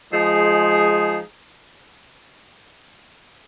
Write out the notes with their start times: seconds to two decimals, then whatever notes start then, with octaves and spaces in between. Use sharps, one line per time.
0.12 F3 G#3 D#4 G#4